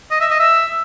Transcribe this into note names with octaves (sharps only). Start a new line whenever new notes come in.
D#5
E5
D#5
E5